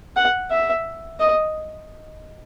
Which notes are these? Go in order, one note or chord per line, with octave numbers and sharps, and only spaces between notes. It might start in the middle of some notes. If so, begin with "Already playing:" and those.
F#5
E5
D#5